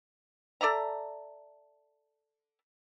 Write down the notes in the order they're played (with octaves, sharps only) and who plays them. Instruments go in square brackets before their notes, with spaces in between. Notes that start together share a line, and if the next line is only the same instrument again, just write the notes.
[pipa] A4 D5 E5 A#5